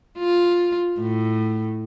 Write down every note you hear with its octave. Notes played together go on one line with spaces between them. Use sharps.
F4
A2